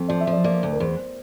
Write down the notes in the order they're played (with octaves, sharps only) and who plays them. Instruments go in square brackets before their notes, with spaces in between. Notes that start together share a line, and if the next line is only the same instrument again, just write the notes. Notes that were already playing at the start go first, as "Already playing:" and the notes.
Already playing: [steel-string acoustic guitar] F2
[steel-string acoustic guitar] F3 [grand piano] D5
[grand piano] E5
[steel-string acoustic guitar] F3
[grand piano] D5
[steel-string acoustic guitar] A#3 [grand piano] D5
[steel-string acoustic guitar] D2
[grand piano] A#4
[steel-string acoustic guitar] E2 [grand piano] C5